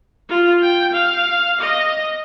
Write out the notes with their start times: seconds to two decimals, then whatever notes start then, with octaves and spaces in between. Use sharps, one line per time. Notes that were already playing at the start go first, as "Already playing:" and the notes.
0.29 F4
0.62 G5
0.93 F5
1.60 D#5